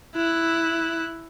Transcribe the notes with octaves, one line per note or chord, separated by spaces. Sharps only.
E4 F#6